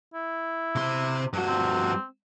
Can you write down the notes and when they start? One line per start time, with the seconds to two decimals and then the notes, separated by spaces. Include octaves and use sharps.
0.14 E4
0.75 C3 C6
1.33 G2 F#4
1.47 C4